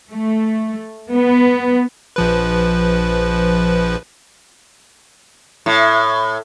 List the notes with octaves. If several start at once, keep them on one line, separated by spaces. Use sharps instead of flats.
A3
B3
A#1 F3 B4
A2